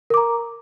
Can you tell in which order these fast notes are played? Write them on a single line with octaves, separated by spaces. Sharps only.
A#4 D6 A#5